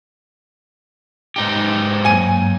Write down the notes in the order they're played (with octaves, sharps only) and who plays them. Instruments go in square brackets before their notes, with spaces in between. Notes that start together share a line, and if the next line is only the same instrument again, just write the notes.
[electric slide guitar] G#2 D#4 G4
[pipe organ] G2 F#3 A#3 [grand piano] G#5 D#7